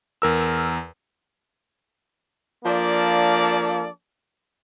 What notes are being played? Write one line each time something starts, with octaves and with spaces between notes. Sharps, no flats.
E2 A#4 E6
F3 A#3 D4 A4 D5